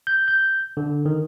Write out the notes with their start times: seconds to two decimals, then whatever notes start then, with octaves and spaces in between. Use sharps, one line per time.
0.07 G6
0.28 G6
0.77 D3
1.06 D#3